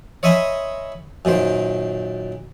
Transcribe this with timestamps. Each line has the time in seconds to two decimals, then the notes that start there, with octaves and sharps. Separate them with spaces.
0.23 C#5 D#5 E5 G#5 B5 C6
1.25 F#2 A#2 D#3 C5